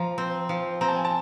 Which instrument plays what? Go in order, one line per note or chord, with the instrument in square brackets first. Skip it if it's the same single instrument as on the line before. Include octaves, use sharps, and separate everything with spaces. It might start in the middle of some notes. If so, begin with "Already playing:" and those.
Already playing: [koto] F3 [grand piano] A#5
[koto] C4
F3
[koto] C4 [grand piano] A#5
[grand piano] A5
G#5
A5